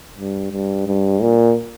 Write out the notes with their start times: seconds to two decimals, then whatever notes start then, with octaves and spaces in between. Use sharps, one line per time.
0.17 G2
0.51 G2
0.87 G2
1.22 A#2